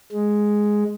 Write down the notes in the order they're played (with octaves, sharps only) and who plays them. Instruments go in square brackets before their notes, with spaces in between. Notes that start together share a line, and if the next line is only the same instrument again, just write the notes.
[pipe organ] G#3